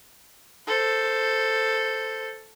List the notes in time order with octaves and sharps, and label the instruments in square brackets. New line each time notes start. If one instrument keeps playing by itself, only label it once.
[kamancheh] A4 C5